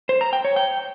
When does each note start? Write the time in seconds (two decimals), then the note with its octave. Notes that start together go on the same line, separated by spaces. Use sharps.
0.09 C5
0.21 A#5
0.33 G5
0.45 C#5
0.56 G5